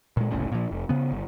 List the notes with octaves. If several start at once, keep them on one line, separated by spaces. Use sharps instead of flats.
A#2 G#3
F#1 C2 A2 C#3
A#2 F3
F1
C#3 B3
G1